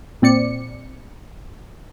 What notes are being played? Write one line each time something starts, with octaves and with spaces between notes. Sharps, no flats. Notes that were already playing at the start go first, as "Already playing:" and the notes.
A#2 C4 D5 C#7